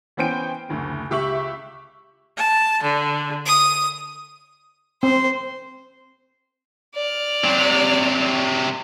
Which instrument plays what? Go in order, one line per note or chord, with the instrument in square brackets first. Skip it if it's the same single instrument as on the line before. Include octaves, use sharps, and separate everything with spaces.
[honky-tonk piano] E3 B3 C#4 C5 G5 D7
F#1 D2
C#2 G4 E5 C#6 F#7
[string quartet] A5
D3
D#6
[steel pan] C4 [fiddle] C5
[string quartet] D5 F6
[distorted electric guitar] C3 F#3